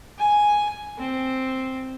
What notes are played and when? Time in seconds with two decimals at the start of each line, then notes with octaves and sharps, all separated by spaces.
0.18 G#5
0.98 C4